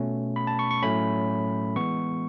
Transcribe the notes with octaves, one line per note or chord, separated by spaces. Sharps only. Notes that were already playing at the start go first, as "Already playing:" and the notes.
Already playing: B2 A3 C#4
B5
A5
C#6
C#6
A2 F#3 A3 C#4 B5
E3 G#3 B3 C#6